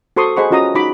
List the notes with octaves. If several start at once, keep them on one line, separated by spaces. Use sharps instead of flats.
F#4 A4 C5 C6 C#6 D#6
G#4 C5 D#5 F#5 B5 C#6
C#4 F4 F#4 D#5 A#5 D#6
D#4 F#4 B5 D6